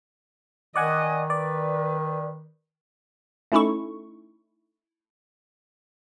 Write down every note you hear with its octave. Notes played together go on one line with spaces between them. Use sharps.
D#3 D5 D#5 F#5 G#5
B4 D5
A3 C#4 D#4 E4 A4 C#6